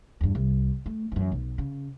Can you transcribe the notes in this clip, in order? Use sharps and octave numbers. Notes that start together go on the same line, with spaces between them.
E2 G2
C2
A3
F#2 E3
B1
C#3